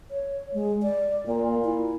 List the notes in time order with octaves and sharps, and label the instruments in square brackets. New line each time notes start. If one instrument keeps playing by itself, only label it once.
[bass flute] C#5
G#3
D5
[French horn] A#2 [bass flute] A#3
[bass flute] E4